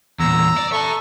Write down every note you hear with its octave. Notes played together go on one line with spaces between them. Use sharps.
E2 A#2 A#5 E6
D5
A4 E5 A#5 C#6